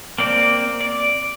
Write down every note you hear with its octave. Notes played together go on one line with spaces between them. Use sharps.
A#3 C4 D5
D5